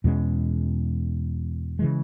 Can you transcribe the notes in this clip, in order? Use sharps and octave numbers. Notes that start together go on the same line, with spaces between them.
E2 B2 G#3 C#4
C#3 E3 G#3